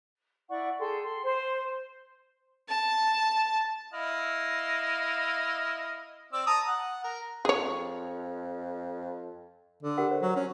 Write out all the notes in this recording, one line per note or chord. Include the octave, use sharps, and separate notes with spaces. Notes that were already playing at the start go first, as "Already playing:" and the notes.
E4 D5 F#5 C#6
G#4 A4 G5 C6
C6
C5 C6
A5
E4 D#5 F5
C4 D5 E6
A5 A#5 D#6
F#5
A#4
F2 G#4 C#5
D3
G4 A#4 F#5
C5 D5
F#3
C#4 C6